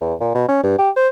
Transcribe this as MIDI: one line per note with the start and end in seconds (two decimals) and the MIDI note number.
0.01 0.14 40
0.20 0.34 46
0.35 0.43 47
0.48 0.60 61
0.63 0.77 43
0.78 0.89 67
0.96 1.08 72